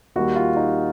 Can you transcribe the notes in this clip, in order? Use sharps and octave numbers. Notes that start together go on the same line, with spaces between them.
D#2 D#3 G3 F#4
F4
D#4